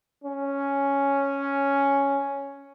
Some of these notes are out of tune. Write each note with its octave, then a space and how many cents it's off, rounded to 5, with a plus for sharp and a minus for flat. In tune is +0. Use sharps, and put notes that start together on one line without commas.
C#4 +5